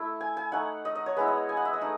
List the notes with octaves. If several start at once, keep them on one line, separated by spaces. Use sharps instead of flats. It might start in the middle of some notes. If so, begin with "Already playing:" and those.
Already playing: A3 E4 E5
G#5
G#5
A3 D#4 F#5
D#5
D#5
C#5
G#3 B3 E4 B4
D#5
G#5
F#5
E5
D#5
A3 D#4